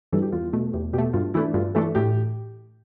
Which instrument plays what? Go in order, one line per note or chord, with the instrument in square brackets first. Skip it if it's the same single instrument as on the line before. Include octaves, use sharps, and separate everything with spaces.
[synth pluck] G2 E3 G3 [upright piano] A4
[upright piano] G4
[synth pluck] E2 [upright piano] F4
[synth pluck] B2 A3
[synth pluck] E2 [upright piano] G4
[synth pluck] B2 [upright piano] G4
[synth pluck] A3
[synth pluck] G2 [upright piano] F4
[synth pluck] E3 A3 D4 [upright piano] E4
[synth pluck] G2 [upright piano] F4
[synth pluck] E3 A3 D4 [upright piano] A4
[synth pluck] A2 [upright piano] G4